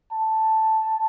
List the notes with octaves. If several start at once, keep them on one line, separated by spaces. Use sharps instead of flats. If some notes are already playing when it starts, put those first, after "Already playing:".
A5